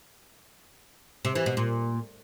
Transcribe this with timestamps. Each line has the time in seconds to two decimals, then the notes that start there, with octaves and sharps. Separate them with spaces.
1.25 C3
1.35 E3
1.46 B2
1.57 A#2